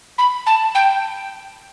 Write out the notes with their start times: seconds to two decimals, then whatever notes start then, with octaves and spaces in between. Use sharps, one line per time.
0.18 B5
0.46 A5
0.75 G5